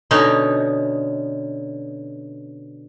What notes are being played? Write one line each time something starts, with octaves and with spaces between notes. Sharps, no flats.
B2 D3 C#4 D#4